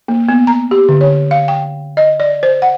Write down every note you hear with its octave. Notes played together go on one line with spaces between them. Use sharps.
A#3
B3
A#5
G4
D3
C#5
F5
G5
D#5
D5
C5
F#5